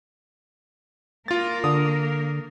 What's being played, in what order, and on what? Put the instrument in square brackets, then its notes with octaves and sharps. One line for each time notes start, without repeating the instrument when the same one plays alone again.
[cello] A#3 A#4 [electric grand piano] F4 A6
[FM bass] D3 [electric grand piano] D#6